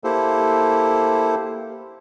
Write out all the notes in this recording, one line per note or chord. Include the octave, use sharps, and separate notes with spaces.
A#3 E4 G4 A4 C5